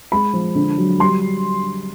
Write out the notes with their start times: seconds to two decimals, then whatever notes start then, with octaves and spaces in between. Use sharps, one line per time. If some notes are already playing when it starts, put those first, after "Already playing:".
0.12 G#3 B5
0.33 F3
0.55 D3
0.77 F#3
0.99 G3 C6